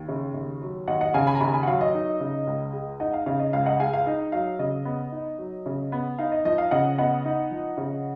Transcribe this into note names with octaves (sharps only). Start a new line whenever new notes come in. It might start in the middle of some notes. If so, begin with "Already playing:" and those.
Already playing: D#2
C#3
D#2
F#3
D#2 D#5 F#5
D#5 F#5
C#3 F5 G#5
G#5 B5
A#5
D#2 G#5 B5
G#5 B5
F#5
F#3 F5
D#5
D#4
C#3
C#2
G#3
D#4 D#5 F#5
F5
C#3 F5
D#5
C#2 F5
D#5 F#5
G#3 F5 G#5
F5
D#4 D#5
F#3 F5
C#3 D#5
B3
D#4
F#3
C#3
B3
D#4 F5
D#5
F3 D#5
F5
C#3 D#5 F#5
B3 D#5 F#5
D#4
F3
C#3